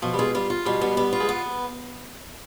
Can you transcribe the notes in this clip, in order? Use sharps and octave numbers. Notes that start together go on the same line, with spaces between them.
B2 F3
G3
G#3 F4
G3 F4
F4
B2 G3
G3 B3
G3 B3
F4
G#3
B3